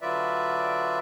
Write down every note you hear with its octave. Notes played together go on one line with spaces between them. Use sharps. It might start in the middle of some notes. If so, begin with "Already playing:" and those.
D3 F#3 F4 B4 D5 E5